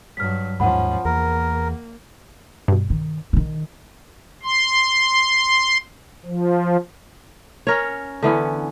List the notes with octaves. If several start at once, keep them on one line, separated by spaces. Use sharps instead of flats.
G2 F#3 F6 B6
D#2 G#2 D#3 F3 C#4 F#5 B5
E2 A#3 A#4
G2 B2
D#3
D3 D#3
C6
F3
C#4 A#4 C#5
D3 E3 B3 C#4